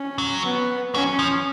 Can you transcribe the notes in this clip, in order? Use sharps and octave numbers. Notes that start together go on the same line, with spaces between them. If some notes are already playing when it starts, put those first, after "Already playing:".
Already playing: C#4
F#3
B3
F#3 C#4
F3